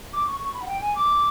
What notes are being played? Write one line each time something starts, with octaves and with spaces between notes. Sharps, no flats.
D6
C#6
C#6
B5
F#5
G5
G#5
D6